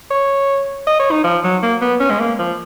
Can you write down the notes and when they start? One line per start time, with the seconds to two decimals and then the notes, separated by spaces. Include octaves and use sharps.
0.11 C#5
0.87 D#5
0.99 C#5
1.11 D#4
1.24 F3
1.44 F#3
1.63 A#3
1.82 B3
2.00 C#4
2.11 G#3
2.20 A#3
2.39 F3